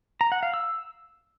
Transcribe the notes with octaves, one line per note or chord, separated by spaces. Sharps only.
A#5
F#5
F5
E6